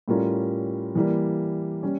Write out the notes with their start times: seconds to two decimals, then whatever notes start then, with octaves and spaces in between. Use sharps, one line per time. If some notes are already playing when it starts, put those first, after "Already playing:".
0.08 A2 G3 C#4 F4 A#4
0.95 E3 G3 A#3
1.83 G3 C#4